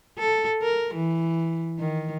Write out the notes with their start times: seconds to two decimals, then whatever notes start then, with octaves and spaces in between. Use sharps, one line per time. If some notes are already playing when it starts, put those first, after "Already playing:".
0.18 A4
0.62 A#4
0.94 E3
1.79 D#3